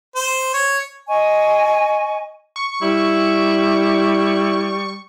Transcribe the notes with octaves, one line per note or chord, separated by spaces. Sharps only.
C5
C#5
D#5 G#5 C#6
C#6
G3 E4